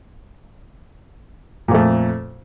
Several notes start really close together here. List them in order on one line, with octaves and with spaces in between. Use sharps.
A#2 F2 A3